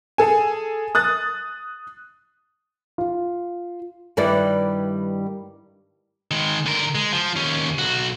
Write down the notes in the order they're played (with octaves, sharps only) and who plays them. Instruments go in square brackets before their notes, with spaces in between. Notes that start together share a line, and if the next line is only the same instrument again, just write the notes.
[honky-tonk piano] G#4 A4 G#5
D#6 F#6 A6
[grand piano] F4
[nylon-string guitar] G2 D#3 G3 E4 B4 D5
[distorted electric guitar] D#3 G#3
D3 A#4
G#3
F3
D#2 C#4
B1 F#4